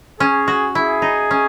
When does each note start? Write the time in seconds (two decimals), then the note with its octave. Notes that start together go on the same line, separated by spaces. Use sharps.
0.20 C#4 G#4
0.48 F#4
0.75 E4 G#4
1.02 D#4
1.31 C#4